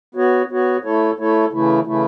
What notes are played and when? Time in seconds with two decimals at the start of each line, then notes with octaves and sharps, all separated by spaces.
0.15 B3 F#4 C#5
0.50 B3 F#4 C#5
0.83 A3 E4 A4 C#5
1.18 A3 E4 A4 C#5
1.52 C#3 E3 A3 E4
1.86 C#3 E3 A3 E4